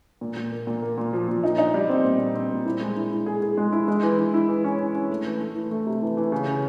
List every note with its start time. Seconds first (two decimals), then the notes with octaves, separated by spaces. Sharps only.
0.21 A#2
0.37 A#2
0.52 A#3
0.67 A#2
0.82 A#3
0.98 A#2
1.13 F3
1.28 A#2
1.43 D#4
1.58 D#4
1.74 G3
1.89 C4
2.04 A#2
2.19 C4
2.35 C4
2.50 A#2
2.65 E4
2.81 G#3
2.96 E4
3.11 E4
3.26 G#4
3.42 G#4
3.58 G#3
3.72 E4
3.88 G#3
4.03 E3
4.18 E3
4.34 E4
4.48 E3
4.64 C#4
4.79 C#4
4.95 C#4
5.10 A3
5.26 E3
5.41 A3
5.55 E3
5.71 A3
5.87 C3
6.02 E3
6.17 E3
6.32 C#3
6.47 C#3